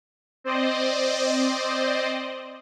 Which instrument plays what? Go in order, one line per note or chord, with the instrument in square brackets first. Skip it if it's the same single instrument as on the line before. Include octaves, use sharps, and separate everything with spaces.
[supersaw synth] C4 C5 D5 D#5